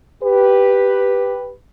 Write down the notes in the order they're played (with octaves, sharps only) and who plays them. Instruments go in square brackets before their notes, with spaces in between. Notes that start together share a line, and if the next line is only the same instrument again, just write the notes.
[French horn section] G4 B4